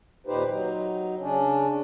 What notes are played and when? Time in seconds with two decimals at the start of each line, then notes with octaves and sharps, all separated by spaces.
0.27 D#2 A#2 D#4 G4 B4 C5
0.48 F#3 D#4
1.20 C#3 C#4 D4